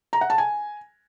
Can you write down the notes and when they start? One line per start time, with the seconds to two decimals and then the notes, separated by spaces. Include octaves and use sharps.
0.13 A#5
0.21 F#5
0.30 A5
0.38 G#5